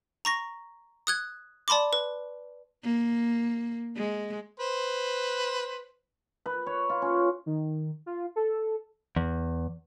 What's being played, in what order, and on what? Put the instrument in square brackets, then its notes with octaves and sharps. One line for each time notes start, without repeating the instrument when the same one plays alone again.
[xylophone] A#5 C#6 A#6
D#6 F#6 G#6
D5 A5 B5 C6 D6
B4
[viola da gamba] A#3
G#3
[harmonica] B4 C5
[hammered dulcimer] B4
C#5
F4
C#4
[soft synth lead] D#3
F4
A4
[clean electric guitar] E2